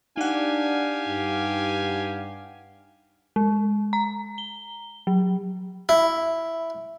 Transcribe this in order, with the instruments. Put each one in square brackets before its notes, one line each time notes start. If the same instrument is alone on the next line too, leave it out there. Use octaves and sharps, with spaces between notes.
[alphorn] D4 [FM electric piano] D#4 F#5 [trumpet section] G4 F5 G#5
[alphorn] G2
[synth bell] G#3
A#5
G7
F#3
[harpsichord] E4